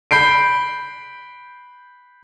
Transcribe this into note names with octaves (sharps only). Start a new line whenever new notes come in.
B5 G6 C7 D7